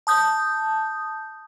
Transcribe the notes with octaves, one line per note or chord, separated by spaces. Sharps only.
A5 D#6 G6